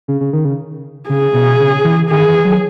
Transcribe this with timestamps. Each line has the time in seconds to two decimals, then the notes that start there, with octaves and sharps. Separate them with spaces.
0.08 C#3
0.21 C#3
0.33 D#3
0.45 C#3
1.09 C#3 G#4
1.34 B2
1.60 C#3
1.84 E3
2.10 D#3 G#4
2.28 E3
2.45 F#3